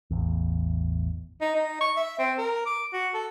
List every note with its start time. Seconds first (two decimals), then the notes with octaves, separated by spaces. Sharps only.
0.11 A1 E2
1.41 D#4
1.55 D#4
1.81 C#6
1.96 E5
2.19 C4
2.38 A#4
2.66 D6
2.93 F#4
3.14 A4